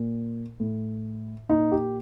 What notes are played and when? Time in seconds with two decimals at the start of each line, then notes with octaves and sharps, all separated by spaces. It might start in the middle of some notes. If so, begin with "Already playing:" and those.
Already playing: A#2
0.60 A2
1.49 A#2 D#4
1.72 G4